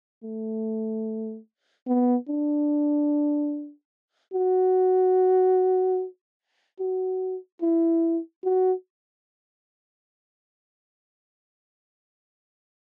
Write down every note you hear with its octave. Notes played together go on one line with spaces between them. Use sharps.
A3
B3
D4
F#4
F#4
E4
F#4